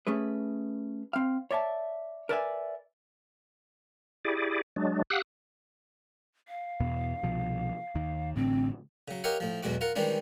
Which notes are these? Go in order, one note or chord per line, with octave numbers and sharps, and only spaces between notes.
A3 C#4 G#4 B4
C4 F5
C#5 D5 E5 F#5 A5
A#4 B4 D5 E5 G5 G#5
E4 G4 G#4 D5
F#3 G#3 D4
G4 F5 F#5 D#6 E6 F#6
F5
E2 B2 B3
C2 B2 F3
D#2 D#3
A1 A2 D3 C4
C#3 F#3
G4 A#4 C#5 D#5 F5 F#5
A2 F3
B1 E2 B2 G#3 F#4 D6
F4 A#4 F#5
D#3 E3 G3 G#3 C#4 D4